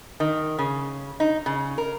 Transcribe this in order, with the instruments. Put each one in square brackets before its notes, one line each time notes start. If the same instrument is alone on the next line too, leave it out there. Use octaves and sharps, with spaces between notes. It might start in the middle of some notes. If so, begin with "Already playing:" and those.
[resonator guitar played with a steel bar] D#3
C#3
D#4
C#3
A#4